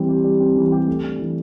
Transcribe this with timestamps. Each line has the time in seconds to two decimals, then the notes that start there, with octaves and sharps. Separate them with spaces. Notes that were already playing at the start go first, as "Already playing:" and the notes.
Already playing: E3 G3 C4
0.09 G4
0.24 G3
0.40 C4
0.56 E3
0.72 G4
0.88 A3
1.03 D4
1.19 E3